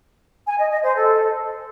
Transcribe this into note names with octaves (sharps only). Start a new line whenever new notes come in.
G#5
D#5
D#5
C5
A4